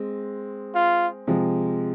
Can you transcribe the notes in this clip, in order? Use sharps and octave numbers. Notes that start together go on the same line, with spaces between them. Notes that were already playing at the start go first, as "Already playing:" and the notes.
Already playing: G#3 C4
F4
C3 F3 G#3